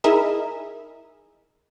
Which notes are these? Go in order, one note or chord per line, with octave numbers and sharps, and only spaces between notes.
D#4 E4 G#4 A#4 E5 D#6